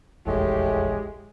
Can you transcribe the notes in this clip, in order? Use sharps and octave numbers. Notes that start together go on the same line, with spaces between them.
F1 A#1 E2 A2 G#3 G4